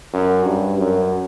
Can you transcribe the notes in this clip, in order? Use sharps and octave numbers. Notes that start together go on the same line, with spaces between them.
F#2
G2
F#2